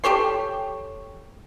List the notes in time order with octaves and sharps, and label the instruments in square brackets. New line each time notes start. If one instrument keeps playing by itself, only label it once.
[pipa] G4 A4 C#5 C6